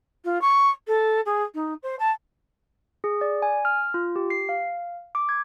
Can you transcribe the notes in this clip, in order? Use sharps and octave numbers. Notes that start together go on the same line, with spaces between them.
F4
C#6
A4
G#4
D#4
C5
A5
G#4
D5
G#5
F6
F4
G4
C7
F5
D6
G#6